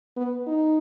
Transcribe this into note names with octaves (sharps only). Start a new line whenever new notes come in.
B3
D#4